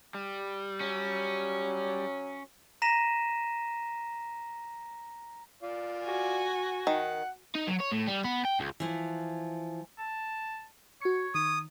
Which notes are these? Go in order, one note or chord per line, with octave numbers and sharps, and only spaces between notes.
G3
F#3 C#4
A#5 A#6 B6 D#7 E7
F4 D5
F#4 G#5
D#3 F#5
D#4
F#3
C#5
A2
G3
B3
G5
C#2
E3 F3
A5
F#4 C#5 C#7
D#3 D#6